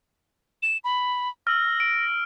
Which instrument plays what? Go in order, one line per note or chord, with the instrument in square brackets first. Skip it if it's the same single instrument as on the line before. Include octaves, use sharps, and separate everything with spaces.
[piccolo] E7
B5
[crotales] E6 F6 [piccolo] A#6
[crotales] D7